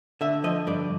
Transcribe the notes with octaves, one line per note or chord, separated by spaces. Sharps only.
D3 E5
F3 D#5
G2 D5